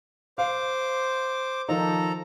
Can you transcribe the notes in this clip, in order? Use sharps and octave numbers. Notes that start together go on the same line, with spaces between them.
C5 F5 D6
D#3 F3 D#4 A4 A#5